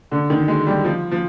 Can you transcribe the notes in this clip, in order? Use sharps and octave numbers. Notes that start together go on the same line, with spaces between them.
D3
D#3
G#3
G3
F3
F3